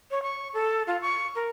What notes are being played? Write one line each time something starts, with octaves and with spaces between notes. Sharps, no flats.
C#5
C#6
A4
F4
C#6
A#4